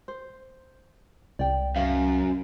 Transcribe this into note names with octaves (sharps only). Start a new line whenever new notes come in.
C5
C2 D5 G5
F#2 C#4 E5 F5